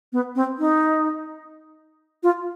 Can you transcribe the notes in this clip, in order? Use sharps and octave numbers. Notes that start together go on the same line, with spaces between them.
B3
C4
D#4
F4